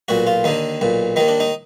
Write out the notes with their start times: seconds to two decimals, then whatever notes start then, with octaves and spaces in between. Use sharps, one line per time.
0.08 B1 A#2 F#4
0.27 F4
0.44 D#2 D3 D#4
0.81 B1 A#2
1.16 D#2 D#3 D#4
1.28 D4
1.40 D#4